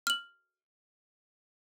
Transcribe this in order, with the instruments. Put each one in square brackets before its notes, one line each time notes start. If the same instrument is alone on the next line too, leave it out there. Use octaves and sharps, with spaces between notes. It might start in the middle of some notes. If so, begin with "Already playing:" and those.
[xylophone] F6 F#7